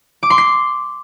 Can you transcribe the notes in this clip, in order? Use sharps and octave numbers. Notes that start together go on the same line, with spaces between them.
D6
C6
C7